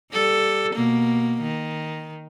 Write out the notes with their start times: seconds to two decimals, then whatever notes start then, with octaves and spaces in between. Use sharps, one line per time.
0.12 G3 A4
0.74 B2 A#3
1.42 D#3